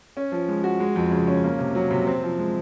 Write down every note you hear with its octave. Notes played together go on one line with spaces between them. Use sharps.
C#4
F3
G#3
F#4
G#3
F2
C#3
C#4
A#3
C3
F#3
C3
C4
F3
G#3